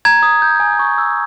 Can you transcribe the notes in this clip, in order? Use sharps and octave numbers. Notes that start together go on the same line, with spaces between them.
A#5 G#6
D#6
G6
G#5
C#6
E6